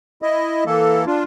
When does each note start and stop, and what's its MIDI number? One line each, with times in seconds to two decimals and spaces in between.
0.22 0.64 64
0.22 0.64 75
0.66 1.05 52
0.66 1.05 58
0.66 1.05 69
1.07 1.24 62
1.07 1.24 65